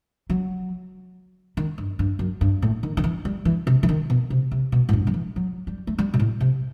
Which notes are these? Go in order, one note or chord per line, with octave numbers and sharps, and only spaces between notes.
F#3
D#3
G2
G2
F#2
G2
A2
D#3
D#3
E3
G3
E3
C3
E3
D#3
B2
C3
C3
B2
A2
G2
F#3
E3
F#3
G3
A3
G3
B2
A2
C3